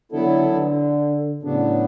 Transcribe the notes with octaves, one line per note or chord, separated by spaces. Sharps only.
D3 F#3 B3 E4 A4
D3
A2 C#3 F#3 B3 D4